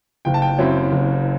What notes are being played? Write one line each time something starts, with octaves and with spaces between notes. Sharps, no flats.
F#1 G5
A5
G5
F#2 F#3 C4 E4
F#1